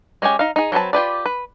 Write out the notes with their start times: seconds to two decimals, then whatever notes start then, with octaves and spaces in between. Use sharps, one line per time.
0.22 G#3 C#4 G4 G#5
0.39 D#4 F5
0.56 D#4 G#4
0.72 F#3 A3 C4 B4 A5
0.93 F4 G4 B4 D5
1.26 B4